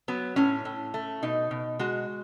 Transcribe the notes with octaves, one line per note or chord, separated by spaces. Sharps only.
F#3 B3
A2 C#4
A2
A3
B2 D#4
B2
G#3 F#4